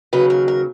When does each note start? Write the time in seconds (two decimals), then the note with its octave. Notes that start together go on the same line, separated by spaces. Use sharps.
0.13 D#2 C#3 F#3 B4
0.30 A#4
0.48 A#4